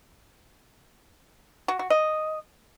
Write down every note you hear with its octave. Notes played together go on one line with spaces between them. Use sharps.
F#4
F#4
D#5